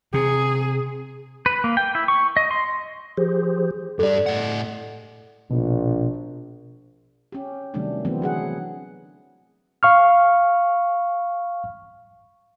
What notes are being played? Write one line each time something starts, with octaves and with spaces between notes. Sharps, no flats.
C3 G#4
B4
A#3
G5
E4
C#6
D#5
C6
F3 G4 G#4 C5
G2 G3 A4 D5
A2 F#5
A#1 B2
C#4 G4
C3 D#3 F#3 G3 A3 D4
D3 E3 F#3 A3 B3 C4
F#3 G#4 F#5
F5 C#6 F6